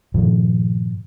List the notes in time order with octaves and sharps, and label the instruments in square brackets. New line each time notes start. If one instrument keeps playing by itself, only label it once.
[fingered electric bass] G2 A#2 D#3 F3